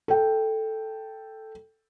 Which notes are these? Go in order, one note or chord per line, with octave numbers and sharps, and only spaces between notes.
A4 G5